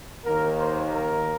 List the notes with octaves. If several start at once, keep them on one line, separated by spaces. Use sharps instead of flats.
D#2 D#3 A#3 A#4
C5
A#4